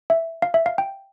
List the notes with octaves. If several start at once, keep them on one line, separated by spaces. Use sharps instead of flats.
E5
F5
E5
F5
G5